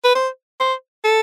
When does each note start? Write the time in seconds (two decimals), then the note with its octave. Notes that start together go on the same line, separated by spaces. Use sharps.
0.04 B4
0.15 C5
0.60 C5
1.04 A4